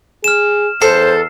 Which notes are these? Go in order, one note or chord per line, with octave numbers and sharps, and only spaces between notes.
G#4 F6 E7
E2 A4 C5 C7